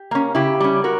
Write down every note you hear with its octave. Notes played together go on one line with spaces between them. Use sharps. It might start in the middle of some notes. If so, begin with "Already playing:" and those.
Already playing: G4
A#3 C#4
C#3 E4 G4
G3 C#4
F#4 A#4